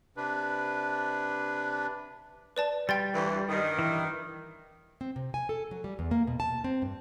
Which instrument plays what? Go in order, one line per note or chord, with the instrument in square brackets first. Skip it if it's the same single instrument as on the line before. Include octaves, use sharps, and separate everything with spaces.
[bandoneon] C3 D4 B4
[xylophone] B4 D5 A5
[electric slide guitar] G3 [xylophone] G5 C6 A6
[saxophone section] D2 G2 E3
G2 D#3
[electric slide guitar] E3
[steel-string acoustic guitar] C4
C3
G#5
A4
F#3
G3
E2
A#3
B2
A5
C4
G2